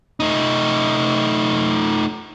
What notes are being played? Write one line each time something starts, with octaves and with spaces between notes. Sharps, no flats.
A3 D#4